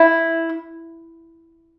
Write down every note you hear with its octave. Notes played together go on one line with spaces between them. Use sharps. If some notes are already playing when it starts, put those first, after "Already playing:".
Already playing: E4